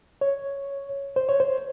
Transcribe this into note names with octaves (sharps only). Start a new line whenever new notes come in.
C#5
C5
C#5
C5